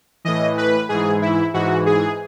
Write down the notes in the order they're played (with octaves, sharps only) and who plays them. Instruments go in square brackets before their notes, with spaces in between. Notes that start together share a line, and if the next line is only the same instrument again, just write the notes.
[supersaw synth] A2 E3 D#5
B4
G#2 E3 G#4
E4
G#2 E3 F#4
G#4